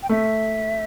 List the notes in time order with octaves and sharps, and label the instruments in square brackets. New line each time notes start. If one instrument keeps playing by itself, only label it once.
[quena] G5
[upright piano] A3 [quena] E5